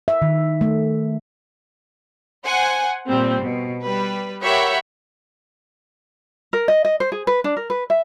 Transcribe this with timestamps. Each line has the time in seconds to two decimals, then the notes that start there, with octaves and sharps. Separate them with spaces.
0.08 E5
0.22 D#3
0.61 A3
2.45 C5 F#5 G#5
3.07 A#2 G3 C4
3.42 B2
3.83 G3 B4
4.43 G4 A#4 C#5 E5 F#5 B5
6.53 A#4
6.68 D#5
6.85 D#5
7.00 C5
7.12 G#4
7.27 B4
7.44 D4
7.57 A#4
7.70 B4
7.90 E5